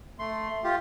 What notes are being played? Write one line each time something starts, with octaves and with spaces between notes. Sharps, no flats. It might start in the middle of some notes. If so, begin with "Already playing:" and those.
A3 C6
F4 G4